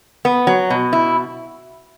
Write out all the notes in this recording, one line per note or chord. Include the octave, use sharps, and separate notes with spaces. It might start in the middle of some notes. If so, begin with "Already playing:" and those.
B3
F#3
B2
E4